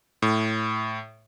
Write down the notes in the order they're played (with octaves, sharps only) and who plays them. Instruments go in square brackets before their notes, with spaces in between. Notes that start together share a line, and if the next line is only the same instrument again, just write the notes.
[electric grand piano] A2